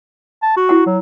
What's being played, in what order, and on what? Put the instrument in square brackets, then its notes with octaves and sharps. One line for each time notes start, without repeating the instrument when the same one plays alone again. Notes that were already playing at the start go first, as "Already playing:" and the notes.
[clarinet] A5
F#4
[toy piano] E4 F#5
[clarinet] F#3